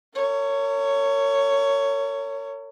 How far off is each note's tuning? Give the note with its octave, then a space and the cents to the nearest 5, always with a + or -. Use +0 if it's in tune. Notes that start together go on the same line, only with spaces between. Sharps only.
A#4 -40 C#5 +10